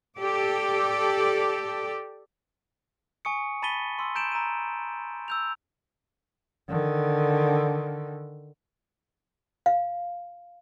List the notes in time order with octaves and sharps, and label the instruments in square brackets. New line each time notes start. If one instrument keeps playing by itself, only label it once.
[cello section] G4 A4 D5
[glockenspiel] G#5 C#6 D#6 C#7
A5 B5 A6 B6 D#7 G7
C6 E6
A#5 G6 D7 E7 F#7
A#5 E6 D#7
E6 G6 F7
[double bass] D3 D#3
[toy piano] F5